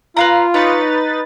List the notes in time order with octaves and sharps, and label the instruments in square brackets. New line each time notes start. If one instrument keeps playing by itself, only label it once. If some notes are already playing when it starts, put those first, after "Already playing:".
[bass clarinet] F4 [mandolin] B4 F5 A#5
[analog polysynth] D#4 B4 A6 [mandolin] C#5